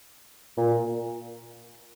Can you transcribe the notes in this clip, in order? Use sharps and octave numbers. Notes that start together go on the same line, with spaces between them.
A#2